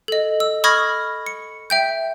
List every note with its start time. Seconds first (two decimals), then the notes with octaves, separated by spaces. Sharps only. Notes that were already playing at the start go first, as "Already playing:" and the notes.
0.08 A4 D#5
0.40 E6
0.64 B5 C#6 D#6 F6 G#6 A#6
1.26 C#7
1.70 E5 G5 G6